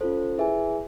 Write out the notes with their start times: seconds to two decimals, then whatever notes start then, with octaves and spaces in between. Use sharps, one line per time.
0.01 C#4 F4 A4 C5
0.38 E4 G#4 B4 E5 G#5